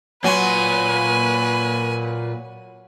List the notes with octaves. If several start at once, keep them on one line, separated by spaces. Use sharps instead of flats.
A#2 F#3 B4 G#5 C6